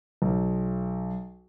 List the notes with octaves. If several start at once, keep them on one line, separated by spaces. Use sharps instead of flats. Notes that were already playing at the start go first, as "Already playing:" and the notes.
B1